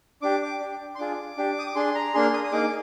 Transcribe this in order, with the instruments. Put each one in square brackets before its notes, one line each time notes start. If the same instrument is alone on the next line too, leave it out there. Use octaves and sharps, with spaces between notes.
[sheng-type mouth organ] D4 G4 D6
D6
D4 G4
C6
D4 F4 G#4 D6
D4 G4
D#6
D6
D4 G#4 C6
A#5
A#3 D4 G#4 C6
D#6
D#6
A#3 D#4 G#4 D6